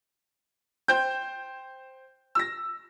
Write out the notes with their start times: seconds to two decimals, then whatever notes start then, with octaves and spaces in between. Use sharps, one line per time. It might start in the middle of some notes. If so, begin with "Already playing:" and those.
0.88 C5 G5 G6
2.35 E6 A#6